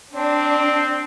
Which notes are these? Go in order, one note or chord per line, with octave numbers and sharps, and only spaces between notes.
C4 D4